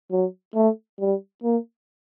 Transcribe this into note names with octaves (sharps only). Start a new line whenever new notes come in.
F#3
A3
G3
A#3